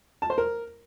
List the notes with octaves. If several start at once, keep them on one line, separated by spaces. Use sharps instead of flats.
A5
C5
A#4